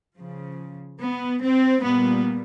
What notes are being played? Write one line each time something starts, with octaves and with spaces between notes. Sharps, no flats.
C#3 F3
B3
C4
A#2 G3 B3